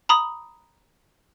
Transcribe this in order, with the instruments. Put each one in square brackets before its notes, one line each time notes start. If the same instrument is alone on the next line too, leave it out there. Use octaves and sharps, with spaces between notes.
[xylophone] A#5 B5 D#6